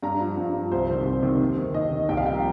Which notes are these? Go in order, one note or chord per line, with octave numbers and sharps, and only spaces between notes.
G2 A#5
F3
G2
F3
C2 C5
C3 D#3
C2
C3 D#3
D#2
D#3
D#2 D#5
D#3
C2 G5
F5
A#2 F3 G5
A#5